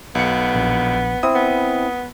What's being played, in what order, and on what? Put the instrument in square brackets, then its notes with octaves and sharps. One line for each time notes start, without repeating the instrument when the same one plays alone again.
[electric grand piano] B1 C#7 [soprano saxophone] B3
[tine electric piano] A#1
[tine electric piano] C4 E4 [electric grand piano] D#6
[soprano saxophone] B3